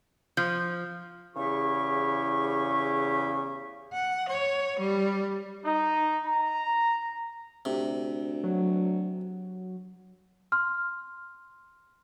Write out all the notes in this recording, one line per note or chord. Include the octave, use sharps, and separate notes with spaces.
F3 G6
E2 C#3 E4 G4 C#6
F#5
C#5
G3
D#4
A#5
D2 C3
F#3
C6 F6